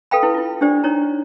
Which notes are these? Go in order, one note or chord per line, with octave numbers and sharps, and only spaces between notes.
A4 B4 F5 G5 B5
E4 B4
E4 F4
D4 G4 C5 D5
D4 D#4 C#5 A#5